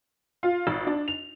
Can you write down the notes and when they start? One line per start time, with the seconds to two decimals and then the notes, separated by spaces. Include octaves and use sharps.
0.43 F4
0.67 G#1
0.87 D4
1.08 F7